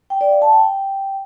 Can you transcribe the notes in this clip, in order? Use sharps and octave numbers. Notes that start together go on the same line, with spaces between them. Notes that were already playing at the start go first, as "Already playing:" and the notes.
G5
D5
F5
A5
G5